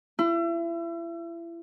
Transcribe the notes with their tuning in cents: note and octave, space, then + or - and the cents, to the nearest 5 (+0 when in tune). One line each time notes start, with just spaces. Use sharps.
E4 +35